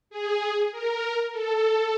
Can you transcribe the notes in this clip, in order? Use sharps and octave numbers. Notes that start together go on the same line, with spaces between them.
G#4
A#4
A4